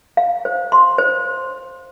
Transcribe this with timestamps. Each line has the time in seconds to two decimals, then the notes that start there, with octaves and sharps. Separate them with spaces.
0.17 F5
0.45 C5
0.72 C6
0.98 C5